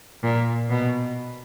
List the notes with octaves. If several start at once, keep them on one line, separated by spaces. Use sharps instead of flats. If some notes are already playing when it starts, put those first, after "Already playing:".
A#2
B2